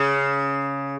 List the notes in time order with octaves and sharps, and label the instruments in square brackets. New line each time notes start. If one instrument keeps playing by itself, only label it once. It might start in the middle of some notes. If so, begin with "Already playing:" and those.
Already playing: [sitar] C#3